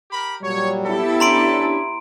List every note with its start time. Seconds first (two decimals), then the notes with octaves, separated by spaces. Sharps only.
0.11 G4 A#4 B5
0.42 A#2 F#3 G3 C#5
0.83 B3 E4 G4 A4
1.20 C#4 D4 A#5 C6 D7